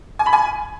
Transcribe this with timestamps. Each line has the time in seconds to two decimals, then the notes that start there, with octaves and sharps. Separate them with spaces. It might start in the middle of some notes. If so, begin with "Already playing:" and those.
0.19 G#5
0.26 B5
0.33 G#5